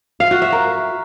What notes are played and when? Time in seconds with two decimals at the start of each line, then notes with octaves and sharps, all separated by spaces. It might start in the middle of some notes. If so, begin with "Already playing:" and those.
0.20 F5
0.31 F#4
0.42 E5
0.52 A#4